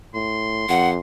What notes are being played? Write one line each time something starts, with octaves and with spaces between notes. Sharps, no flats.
A2 C6
F2 F#5